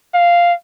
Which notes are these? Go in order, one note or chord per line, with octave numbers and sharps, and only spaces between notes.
F5